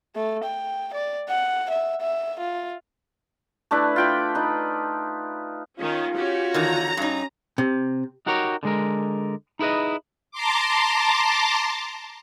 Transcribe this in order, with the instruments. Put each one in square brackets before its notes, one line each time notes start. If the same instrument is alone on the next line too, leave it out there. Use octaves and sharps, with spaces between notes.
[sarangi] A3
G5
D5
F#5
E5
E5
F4
[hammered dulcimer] A3 D4 E4 B4
F4 G5 B5
D#4 B4
[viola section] D#3 C#4 [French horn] F4
[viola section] C#4 G4 [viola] F#4 C#5
[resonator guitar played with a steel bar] E2 D3 D#3 [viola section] A#5
[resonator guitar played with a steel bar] G2 D#4 [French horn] C#4
[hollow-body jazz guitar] C3
[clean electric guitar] D#4 F#4 G4 A#4 C#5
D3 G#3 A#4
D#4 E4 G#4 B4 D#5
[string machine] A5 A#5 C6 D6